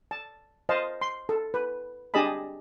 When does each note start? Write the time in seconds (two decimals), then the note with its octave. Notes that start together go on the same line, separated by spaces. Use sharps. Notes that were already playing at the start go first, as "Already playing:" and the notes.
0.11 A5
0.69 C5 D#5 F5 A5
1.01 C6
1.29 A4
1.54 B4
2.14 D4 G4 G#4 D#5 A5 B5